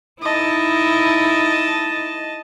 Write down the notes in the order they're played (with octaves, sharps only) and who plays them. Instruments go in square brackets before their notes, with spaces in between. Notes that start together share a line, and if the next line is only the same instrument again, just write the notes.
[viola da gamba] D#4 E4 [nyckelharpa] D#5 A5